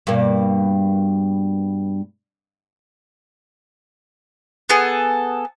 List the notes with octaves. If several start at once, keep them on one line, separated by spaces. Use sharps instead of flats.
G2 B2 A#3
B3 G#4 A4